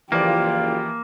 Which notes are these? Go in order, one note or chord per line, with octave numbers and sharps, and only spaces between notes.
F#1 E3 F3 A#3 F4 G4 D5